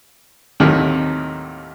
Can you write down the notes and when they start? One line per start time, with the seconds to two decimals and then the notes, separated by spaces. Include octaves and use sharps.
0.60 D#2 A2 C3 D#3 F#3 A3